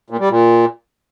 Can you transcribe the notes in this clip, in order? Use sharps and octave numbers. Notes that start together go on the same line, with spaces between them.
A#2
G3
A#2